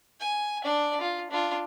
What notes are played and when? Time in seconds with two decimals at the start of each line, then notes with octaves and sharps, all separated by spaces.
0.20 G#5
0.64 D4 D5
1.01 F4
1.31 D4 F4